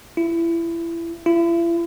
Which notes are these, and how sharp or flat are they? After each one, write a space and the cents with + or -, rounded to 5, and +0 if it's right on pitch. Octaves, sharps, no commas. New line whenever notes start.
E4 +25
E4 +40